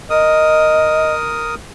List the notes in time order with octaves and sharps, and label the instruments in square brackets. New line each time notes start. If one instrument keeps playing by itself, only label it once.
[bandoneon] A#4 D#6 [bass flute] D#5